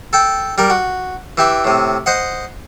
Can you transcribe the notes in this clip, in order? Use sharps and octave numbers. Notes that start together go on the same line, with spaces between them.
A4 G5
G3 A#4
F#4
E3 G4 E5
A2 C3
C5 D#5 F#5